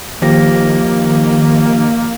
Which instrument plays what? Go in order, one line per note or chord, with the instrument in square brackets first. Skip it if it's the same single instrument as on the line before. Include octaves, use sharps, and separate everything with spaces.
[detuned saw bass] D#3 [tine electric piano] F3 G4 A#6 [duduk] A#3